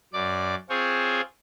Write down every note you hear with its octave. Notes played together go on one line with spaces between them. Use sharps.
F#2 D5 D6
C4 F4 G#4 C5 C#5